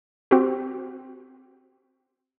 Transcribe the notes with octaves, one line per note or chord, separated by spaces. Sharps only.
C4 F#4 G4